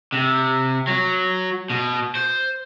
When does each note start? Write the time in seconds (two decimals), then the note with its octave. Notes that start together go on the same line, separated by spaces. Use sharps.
0.12 C3
0.87 F#3
1.70 B2
2.15 C5